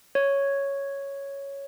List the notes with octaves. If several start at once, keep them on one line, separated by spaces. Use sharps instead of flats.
C#5